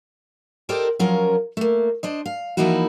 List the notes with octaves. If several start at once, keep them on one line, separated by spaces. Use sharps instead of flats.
G4 A4 A#4 C5 D5 D#5
F3 F#3 C#4 F4 A#4
A3 A#3
D4 C5 D#5
F5
E3 F3 A#3 D#4 E4 F#4